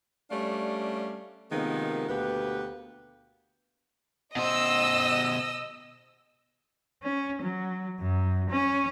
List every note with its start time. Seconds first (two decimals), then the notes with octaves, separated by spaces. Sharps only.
0.31 G3 A3 C#4 D4 D5 F5
1.51 C3 D#3 F3 G#3 A#3 B3
2.09 D2 B2 A#3 B3 G4 B4
4.36 B2 C5 D#5 E6
7.03 C#4
7.42 F#3
8.00 F#2
8.50 C#4